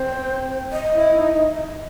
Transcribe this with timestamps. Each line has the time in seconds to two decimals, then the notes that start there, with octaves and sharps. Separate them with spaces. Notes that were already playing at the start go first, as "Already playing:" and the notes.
Already playing: C4 C5
0.72 D#5
0.95 E4
1.16 D#4